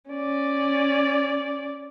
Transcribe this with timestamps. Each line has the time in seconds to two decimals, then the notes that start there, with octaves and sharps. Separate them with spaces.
0.10 C#4 D5